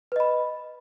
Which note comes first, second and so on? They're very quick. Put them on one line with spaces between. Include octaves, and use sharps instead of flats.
B4 D#5 B5